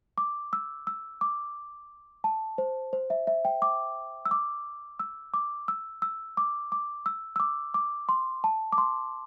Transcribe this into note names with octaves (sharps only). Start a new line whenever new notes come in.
D6
E6
E6
D6
A5
C5
C5
E5
E5
G5
D6
E6
D6
E6
D6
E6
E6
D6
D6
E6
E6
D6
D6
C6
A5
D6
C6